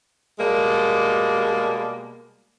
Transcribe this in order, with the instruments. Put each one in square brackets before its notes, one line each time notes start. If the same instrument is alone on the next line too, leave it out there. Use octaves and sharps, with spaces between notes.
[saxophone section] B2 G3 G#3 A#3